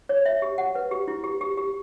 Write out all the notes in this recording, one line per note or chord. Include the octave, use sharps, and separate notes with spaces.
C#5
E5
G4
F#5
B4
G4
E4
G4
G4
G4